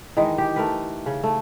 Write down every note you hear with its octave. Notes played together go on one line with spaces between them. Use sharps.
D#3 E3 G#3 D#4
G4
A3 A#4 B4
C#3
A3